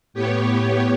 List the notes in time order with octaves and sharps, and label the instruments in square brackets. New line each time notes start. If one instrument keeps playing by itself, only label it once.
[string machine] A2 B3 G4 C#5